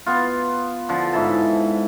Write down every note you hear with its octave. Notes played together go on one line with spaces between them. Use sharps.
B3 F4
D3 F3
G#2 E4 A5